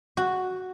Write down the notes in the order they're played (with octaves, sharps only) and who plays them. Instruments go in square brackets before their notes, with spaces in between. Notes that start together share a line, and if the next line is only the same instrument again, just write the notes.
[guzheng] F#4